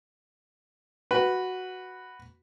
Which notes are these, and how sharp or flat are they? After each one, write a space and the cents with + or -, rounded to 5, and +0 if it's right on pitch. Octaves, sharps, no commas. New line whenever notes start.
F#4 +0 B4 +0